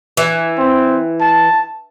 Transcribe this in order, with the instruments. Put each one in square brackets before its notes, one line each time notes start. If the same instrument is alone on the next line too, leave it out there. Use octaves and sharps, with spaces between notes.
[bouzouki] E3
[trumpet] C4
A5